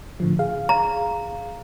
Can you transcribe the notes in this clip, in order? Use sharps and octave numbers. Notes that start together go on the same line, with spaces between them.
A2 D3 F3
G#4 F5
A#5